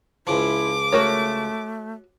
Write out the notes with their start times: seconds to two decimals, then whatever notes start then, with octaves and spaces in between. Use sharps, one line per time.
0.27 C#2 C#3 F3 E4 D6
0.92 A3 F#4 A#4 C#5